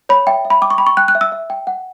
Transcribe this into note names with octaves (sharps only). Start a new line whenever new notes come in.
C#5 B5
E5 G5
E5
B5
G5 D6
C#6
G5 B5
C#6
G5 F#6
F#6
E5
E6
E5
G5
F#5